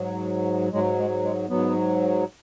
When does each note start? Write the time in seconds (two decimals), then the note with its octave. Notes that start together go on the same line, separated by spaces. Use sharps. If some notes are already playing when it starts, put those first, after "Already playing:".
Already playing: G#2 F#3
0.72 G#2 F#3 G#3
0.99 G#3
1.24 G#3
1.49 G#2 F#3 B3